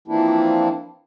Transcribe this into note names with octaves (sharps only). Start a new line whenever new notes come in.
E3 F3 A#3 C4 D4 E4